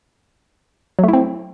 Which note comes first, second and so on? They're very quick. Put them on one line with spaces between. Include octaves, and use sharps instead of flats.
F#3 A3 E4 C4